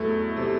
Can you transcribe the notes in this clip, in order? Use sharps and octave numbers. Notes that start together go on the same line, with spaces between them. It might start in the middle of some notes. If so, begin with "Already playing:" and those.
Already playing: E2 F#3 A3
C3